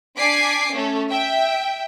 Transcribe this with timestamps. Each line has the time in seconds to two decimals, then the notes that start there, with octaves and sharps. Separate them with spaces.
0.18 D4 D5 G#5 D6 B6 C7
0.72 A3 C#4 A4
1.10 E5 G5